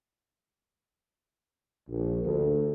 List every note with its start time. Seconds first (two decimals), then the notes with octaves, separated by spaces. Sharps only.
1.89 A#1
2.23 D2